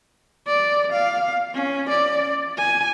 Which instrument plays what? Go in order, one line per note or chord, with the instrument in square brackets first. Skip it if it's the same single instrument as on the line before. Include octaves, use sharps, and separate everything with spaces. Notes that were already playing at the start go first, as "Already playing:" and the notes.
[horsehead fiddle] D5
F5
C#4
D5
G#5